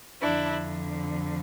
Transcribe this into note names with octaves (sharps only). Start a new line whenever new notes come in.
F2 D3 D4 E4